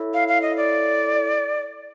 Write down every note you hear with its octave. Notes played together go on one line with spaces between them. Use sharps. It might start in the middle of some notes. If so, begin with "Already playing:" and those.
Already playing: E4 A4 C#5 E5
F5
F5
D#5
D5